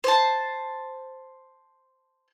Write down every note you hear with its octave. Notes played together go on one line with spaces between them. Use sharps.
C5 A5